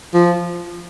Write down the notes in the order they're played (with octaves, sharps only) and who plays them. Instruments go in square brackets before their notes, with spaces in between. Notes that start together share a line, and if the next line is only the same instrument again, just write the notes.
[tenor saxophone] F3